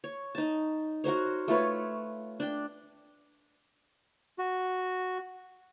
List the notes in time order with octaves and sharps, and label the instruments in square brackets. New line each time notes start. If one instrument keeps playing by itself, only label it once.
[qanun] C#5
D#4 A5
F#4 A#4 C5 C#5
A3 F4 B4 C#5
D4 G5
[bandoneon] F#4